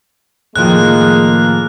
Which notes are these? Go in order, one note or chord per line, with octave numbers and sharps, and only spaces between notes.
A2 D#3 F3 G#3 A#3 F#6